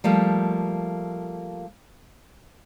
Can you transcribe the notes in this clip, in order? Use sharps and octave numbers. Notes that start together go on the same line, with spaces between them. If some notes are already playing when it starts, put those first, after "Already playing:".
F3 G3 A3 A#3